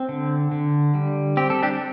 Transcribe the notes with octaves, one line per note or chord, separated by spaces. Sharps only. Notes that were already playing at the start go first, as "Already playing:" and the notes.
Already playing: C4
D3
D3
G3
C4 G4
A4
D4 G4